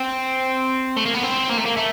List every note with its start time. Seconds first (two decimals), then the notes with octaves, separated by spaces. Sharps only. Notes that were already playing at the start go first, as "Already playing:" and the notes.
Already playing: C4
0.97 A3
1.06 A#3
1.15 B3
1.24 C4
1.50 A#3
1.58 A3
1.66 A#3
1.77 A3